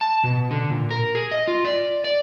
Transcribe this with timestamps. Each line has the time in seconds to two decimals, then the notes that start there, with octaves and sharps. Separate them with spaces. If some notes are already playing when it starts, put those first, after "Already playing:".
0.01 A5
0.24 B2
0.51 D3
0.70 A#2
0.90 A#4
1.15 G#4
1.31 D#5
1.48 F4
1.65 D5
2.04 D5